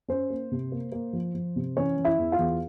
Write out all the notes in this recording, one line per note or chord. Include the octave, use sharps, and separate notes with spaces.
C#4 C5
A#3
C3
A#3
A#3
F3
F3
C3
E3 C#4 C#5
E3
E4 E5
E2
F4 F5
E2